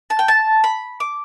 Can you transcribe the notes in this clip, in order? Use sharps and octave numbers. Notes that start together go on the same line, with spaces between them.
A5
G5
A5
B5
D6